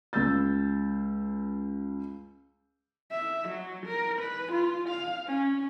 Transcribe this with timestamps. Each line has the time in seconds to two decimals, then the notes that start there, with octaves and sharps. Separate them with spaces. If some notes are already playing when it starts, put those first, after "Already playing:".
0.13 C#2 E6 G6 A6
3.12 E5
3.49 F#3
3.86 A#4
4.20 B4
4.53 F4
4.89 F5
5.27 C#4